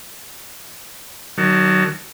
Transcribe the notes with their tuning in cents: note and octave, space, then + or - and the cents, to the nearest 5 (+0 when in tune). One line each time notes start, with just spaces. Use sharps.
D#3 -20 F#3 +20 A5 +0